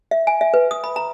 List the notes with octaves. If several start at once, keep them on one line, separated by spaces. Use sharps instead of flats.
E5
G#5
E5
B4
D#6
B5
A#5